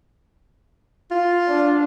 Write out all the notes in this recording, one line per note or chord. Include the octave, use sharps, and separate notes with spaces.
F4
D4